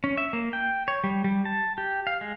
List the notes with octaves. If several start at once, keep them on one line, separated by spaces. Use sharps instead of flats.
C#4
E5
A#3
G5
C#5
G3
G3
A5
G4
F5
G#3